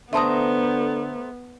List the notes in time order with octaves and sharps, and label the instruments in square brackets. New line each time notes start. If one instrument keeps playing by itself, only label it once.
[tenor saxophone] D3 [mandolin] A3 C5 A#5 [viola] B3 [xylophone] E5 A5 D#6